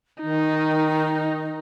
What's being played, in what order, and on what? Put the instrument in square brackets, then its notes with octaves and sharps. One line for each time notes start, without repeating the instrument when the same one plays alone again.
[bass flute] D#3 [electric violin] D#4